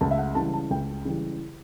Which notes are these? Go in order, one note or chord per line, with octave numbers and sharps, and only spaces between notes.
C#2 A5
E5
F#5
C#3 E3 G3 A5
A5
C#2 G5
C#3 E3 G3